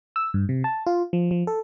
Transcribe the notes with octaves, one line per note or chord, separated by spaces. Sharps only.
E6
G2
C3
A5
F4
F3
F3
A4